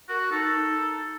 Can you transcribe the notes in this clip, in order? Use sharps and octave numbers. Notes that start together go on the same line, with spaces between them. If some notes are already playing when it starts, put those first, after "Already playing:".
F#4 A#4
D#4 A4